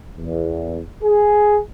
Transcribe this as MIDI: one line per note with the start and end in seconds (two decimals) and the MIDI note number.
0.16 0.80 40
1.03 1.59 68